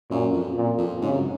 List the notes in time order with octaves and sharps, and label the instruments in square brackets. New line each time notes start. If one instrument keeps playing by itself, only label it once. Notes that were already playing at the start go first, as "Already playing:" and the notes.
[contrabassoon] F#2 [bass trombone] A#2
[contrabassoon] F2
[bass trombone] A#2
[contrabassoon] F2
[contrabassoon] G#2 [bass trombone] C#3
[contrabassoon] F#2